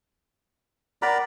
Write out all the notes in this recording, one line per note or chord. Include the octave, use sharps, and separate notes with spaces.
A#4 D5 F#5 A#5 B5